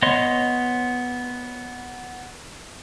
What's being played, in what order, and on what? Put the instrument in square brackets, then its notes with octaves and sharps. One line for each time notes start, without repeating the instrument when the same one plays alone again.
[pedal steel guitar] B3 C#5 D#5 C6